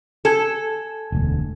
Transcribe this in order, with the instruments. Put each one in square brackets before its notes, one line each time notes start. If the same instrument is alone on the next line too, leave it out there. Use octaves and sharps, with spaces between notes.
[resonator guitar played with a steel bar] A4 [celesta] G#5 G#6
[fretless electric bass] E1 D2